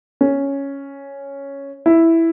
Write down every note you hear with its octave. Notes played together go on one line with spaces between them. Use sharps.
C#4
E4